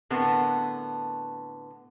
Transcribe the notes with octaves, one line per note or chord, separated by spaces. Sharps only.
A2 D3 B3 C4 A#4